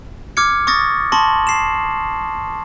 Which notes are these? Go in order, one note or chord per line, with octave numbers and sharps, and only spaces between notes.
D6 F6 G#6 C#7
C#6 D#6 A6 A#6
A5 C6 C#6 A#6 F#7
C7 E7